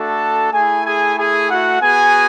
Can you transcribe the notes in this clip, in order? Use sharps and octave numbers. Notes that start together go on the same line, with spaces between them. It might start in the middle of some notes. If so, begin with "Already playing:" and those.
Already playing: A3 D4 F#4 A4 A5
A3 E4 G#4 G#5
G#4 G#5
G#4 G#5
F#4 F#5
B3 F#4 G#4 G#5